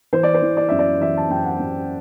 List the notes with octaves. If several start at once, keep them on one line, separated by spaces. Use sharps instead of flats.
E3 C5
D5
C5
E3
D5
F#2 E5
D5
E3 E5
A5
F#2 G5
F#5
F#2